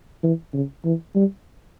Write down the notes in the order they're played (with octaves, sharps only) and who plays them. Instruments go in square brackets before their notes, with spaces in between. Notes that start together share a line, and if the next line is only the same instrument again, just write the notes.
[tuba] E3
C#3
E3
G3